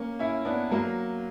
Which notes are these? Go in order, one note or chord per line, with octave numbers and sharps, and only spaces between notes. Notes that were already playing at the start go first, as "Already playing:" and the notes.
Already playing: A#3 C#4
C#4 E4
B3 D4
F#3 A#3